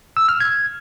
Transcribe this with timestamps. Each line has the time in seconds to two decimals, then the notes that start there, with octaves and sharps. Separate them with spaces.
0.17 E6
0.29 F6
0.40 G#6